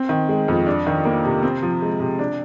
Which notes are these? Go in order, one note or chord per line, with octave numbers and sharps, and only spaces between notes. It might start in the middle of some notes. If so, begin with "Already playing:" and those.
Already playing: C4
D#3
G#3
F2
D4
D#3
A#3
C3
C4
F3
G#3
C3
D4